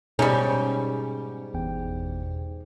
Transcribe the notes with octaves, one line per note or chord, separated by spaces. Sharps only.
G#2 B2 G3 C#4 D#4 G#4
G1 E2 G5